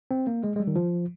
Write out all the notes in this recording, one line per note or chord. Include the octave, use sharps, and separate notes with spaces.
C4
A#3
G#3
G#3
G3
D#3
F3